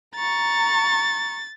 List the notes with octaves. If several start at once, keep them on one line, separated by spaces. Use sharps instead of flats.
A#5 C#6 A6